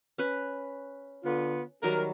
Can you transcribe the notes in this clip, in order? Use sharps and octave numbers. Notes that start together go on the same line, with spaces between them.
C#4 B4
D3 B3 F4
D#3 F#3 G3 A#4